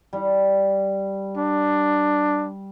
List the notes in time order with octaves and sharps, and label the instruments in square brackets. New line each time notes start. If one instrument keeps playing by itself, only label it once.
[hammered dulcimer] G3
[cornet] D4